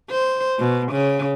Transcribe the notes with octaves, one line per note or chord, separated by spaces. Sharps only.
C5
B2
C#3